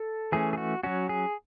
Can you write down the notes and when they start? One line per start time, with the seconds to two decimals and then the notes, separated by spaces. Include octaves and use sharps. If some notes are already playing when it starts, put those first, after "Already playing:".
Already playing: A4
0.32 E3 A3 C#4 G#4
0.53 G#4
0.58 F#4
0.83 F#3 C#4 F#4
1.09 G#4